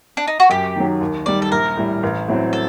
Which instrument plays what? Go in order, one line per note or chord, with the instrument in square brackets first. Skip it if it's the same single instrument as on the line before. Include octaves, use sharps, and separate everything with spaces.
[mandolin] D4
D#4
F#4
[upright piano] F#2 [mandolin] G4
[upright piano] D#3 F#3
D#2
[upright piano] D#3 G3 [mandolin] D5
[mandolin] A4
[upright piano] A#1 [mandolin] A#4
[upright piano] A2 G3
A1
A2 F#3 C4
[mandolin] A4